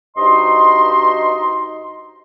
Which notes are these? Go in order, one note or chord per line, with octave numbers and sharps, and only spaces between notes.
G2 D#4 F#4 C5 D#5 C6